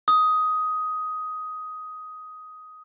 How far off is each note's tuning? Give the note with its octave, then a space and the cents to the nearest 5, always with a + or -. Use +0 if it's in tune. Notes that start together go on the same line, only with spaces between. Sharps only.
D#6 +10